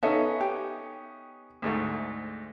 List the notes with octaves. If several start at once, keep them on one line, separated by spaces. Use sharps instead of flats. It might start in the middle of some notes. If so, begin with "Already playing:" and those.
B3 C#4 D#4 A4 E5
G4
D2 G#2 A3